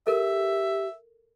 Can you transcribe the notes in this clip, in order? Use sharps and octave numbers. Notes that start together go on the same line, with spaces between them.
G4 A4 A#4 E5